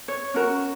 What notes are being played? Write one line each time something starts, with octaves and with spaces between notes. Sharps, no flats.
C#5
C#4 F#4 A#4